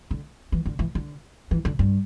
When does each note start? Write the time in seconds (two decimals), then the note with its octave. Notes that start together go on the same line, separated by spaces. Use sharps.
0.11 D3
0.52 E3
0.66 D3
0.79 E3
0.95 D3
1.51 E3
1.65 D3
1.79 G2